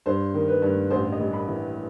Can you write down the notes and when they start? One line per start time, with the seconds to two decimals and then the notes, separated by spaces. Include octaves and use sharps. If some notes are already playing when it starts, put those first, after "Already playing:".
0.06 G2 C5
0.34 D#3
0.48 B4
0.62 G2
0.90 A1 C5
1.12 D#5
1.20 G3
1.33 B5
1.48 E3